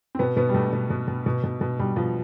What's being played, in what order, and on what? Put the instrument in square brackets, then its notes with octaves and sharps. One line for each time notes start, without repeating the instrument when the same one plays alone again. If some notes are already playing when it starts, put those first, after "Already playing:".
[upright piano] C4
B2 B3
B2 B3
G3
B2 A3
B2
B2
B2
B2
B2
B2
B2 G3
B2 F3